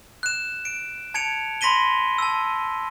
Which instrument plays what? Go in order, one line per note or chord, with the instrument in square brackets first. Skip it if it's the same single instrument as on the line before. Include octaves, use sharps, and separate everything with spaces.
[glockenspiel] F#6 E7
D7
A5 G#6 C#7 D7 F7
B5 C6 A#6 B6 D#7 G7
A5 E6